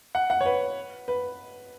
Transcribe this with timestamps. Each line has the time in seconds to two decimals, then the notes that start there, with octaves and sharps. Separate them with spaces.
0.15 F#5
0.30 F#5
0.41 C#5
0.46 B4
1.08 B4